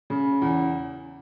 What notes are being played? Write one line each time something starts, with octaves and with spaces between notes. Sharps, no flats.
C#3
E2